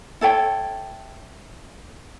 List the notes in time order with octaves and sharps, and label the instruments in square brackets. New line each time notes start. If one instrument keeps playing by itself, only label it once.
[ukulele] E4 A4 C#5 G5